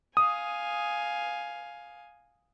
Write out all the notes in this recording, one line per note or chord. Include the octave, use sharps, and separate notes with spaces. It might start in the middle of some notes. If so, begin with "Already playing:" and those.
F5 G#5 D#6